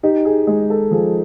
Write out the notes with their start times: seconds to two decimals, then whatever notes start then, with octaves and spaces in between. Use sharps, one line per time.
0.03 D#4 G4
0.25 G#4
0.47 G#3 G#4
0.70 A4
0.91 F3 G#4